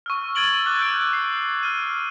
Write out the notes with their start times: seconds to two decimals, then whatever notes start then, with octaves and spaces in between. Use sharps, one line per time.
0.06 C#6 E6 F6
0.35 E6 G#6 A6 D7 F#7 G7
0.66 D6 F6 F#6 G#6 A6
0.79 E6 G6 D7 F#7
1.13 C7
1.63 F6 D#7